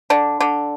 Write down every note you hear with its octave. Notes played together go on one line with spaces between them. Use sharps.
D3 D4
D3